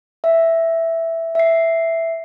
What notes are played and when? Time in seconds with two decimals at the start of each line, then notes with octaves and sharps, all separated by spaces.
0.24 E5
1.35 E5 C7